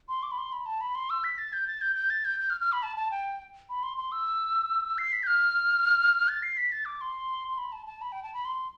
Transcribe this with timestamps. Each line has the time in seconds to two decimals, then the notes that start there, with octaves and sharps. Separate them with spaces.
0.09 C6
0.23 D6
0.31 B5
0.38 C6
0.52 B5
0.66 A5
0.81 B5
0.95 C6
1.10 E6
1.24 B6
1.38 A6
1.53 G6
1.68 A6
1.81 G6
1.96 G6
2.10 A6
2.25 G6
2.40 G6
2.50 F6
2.61 F6
2.72 B5
2.83 A5
2.96 A5
3.11 G5
3.69 B5
3.83 C6
3.97 C6
4.12 E6
4.98 C7
5.12 B6
5.23 G6
5.27 F6
6.28 A6
6.43 C7
6.57 B6
6.72 A6
6.85 D6
7.01 C6
7.48 C6
7.58 B5
7.72 A5
7.86 A5
8.01 B5
8.12 G5
8.23 A5
8.34 B5
8.45 C6